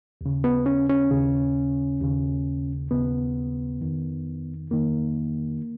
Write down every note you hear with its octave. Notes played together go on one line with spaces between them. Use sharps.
D#2 C#3
B3
C#4
C#4
D#2 C#3
D#2 C#3
D#2 C#3 B3
F2 D#3
F2 D#3 A#3